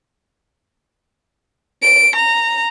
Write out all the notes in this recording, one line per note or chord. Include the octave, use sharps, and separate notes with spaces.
D7
A#5